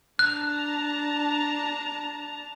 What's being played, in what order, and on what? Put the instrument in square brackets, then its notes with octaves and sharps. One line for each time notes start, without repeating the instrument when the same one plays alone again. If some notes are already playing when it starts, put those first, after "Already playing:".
[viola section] D4 A5 A#5 [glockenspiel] F#6